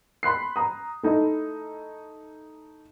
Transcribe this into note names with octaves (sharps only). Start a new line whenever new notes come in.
B5 C6 F#6 C7
A#5 D#6
A3 D#4 E4